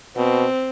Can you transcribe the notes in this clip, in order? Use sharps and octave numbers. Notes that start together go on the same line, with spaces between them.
B2 C4